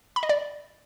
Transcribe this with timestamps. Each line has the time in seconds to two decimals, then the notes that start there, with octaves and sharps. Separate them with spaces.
0.16 B5
0.23 D#5
0.29 D5